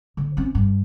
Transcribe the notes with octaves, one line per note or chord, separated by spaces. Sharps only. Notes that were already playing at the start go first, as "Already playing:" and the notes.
D3
C4 C#4
G2